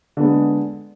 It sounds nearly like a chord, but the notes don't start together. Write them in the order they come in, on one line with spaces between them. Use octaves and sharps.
D3 B3 G#3